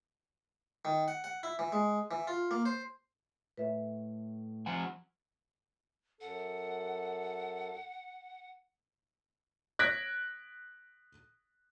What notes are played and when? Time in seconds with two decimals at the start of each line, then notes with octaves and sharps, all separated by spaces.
0.85 D#3
1.08 F#5
1.24 F#5
1.43 E4
1.59 E3
1.72 G#3
2.11 E3
2.27 F4
2.51 A#3
2.65 C5
3.57 A2 B4 E5
4.66 F3 F#5 G#5
6.21 F#2 A4 F#5
9.79 F#6 G#6 A#6 B6 D7